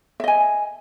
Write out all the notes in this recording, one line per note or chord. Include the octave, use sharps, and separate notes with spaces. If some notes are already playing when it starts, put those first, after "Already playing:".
D#5 E5 G#5